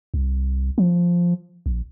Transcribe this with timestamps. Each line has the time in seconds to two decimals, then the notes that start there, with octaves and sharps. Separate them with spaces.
0.14 C2
0.78 F3
1.66 A#1